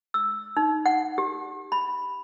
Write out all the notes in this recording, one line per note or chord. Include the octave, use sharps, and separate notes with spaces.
E6
D#4
F#5
G4
B5